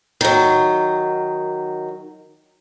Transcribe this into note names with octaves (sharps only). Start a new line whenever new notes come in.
D#3 F#3